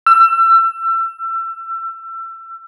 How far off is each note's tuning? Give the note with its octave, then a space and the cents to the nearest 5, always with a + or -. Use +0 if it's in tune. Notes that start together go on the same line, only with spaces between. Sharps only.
E6 +30